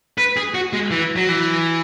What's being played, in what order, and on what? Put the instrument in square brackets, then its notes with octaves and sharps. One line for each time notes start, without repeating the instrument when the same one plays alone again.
[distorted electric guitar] B4
G#4
F#4
G#3
E3
F#3
E3